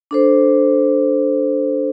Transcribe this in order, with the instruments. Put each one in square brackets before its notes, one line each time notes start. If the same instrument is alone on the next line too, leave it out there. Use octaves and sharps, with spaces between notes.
[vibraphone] D4 A4 C5